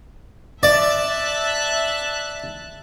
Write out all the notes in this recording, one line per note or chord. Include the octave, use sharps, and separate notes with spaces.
D5 E5 A5 F#6